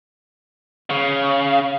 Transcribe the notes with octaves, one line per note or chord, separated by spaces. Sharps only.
C#3